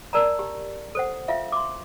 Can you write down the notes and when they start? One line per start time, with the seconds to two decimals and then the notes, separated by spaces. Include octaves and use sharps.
0.13 A#4 D5 A5 A#5
0.39 G4
0.95 A4 C5 F#5
1.28 F4 E5 F5
1.52 C6 D6